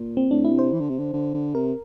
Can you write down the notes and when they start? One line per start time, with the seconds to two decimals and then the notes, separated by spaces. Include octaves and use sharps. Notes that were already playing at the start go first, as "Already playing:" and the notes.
Already playing: A#2
0.17 C4
0.31 A2 D4
0.45 E4
0.51 C3
0.59 C5
0.73 E3
0.80 D3
0.89 C3
0.98 D3
1.13 D3
1.34 D3
1.54 C3 A#4